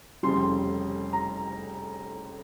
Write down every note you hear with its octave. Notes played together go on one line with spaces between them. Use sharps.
F1 F2 C#3 G3 C6
A#5